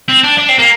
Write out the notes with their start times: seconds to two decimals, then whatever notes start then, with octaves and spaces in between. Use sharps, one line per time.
0.08 C4
0.24 D4
0.38 D4
0.49 C4
0.59 A#3